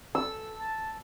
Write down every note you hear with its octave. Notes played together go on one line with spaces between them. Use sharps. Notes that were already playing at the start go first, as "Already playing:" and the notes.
A4 E6
A5